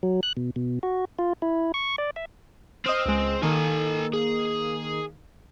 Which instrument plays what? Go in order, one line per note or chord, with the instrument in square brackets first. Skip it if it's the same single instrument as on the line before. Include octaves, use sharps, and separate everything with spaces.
[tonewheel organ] F#3
F#6
B2
B2
F#4
F4
E4
C#6
D5
E5
[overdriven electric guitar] C4 [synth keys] D#5 D#6 F6
[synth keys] C#2 G#3
[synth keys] D#3 A#3 [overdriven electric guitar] A4 G#5
[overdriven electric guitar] G#4